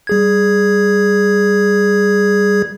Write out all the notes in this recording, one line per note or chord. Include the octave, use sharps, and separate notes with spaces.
G3 G#4 G#6